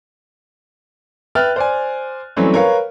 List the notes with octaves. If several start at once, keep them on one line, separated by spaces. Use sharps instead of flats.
B4 E5 G5 F6 F#6 A6
C5 D5 G#5
E3 F#3 G3 A3 C4 C#4
A#4 B4 C#5 F5